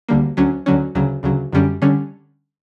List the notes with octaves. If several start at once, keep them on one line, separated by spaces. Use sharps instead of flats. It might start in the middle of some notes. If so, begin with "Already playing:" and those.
D2 D3 G3 A#3
D2 D3 F#3 C#4
D2 D3 F#3 C#4
D2 C#3 F#3
D2 C#3 F#3
F#2 D3 G3 C#4
D3 G3 C#4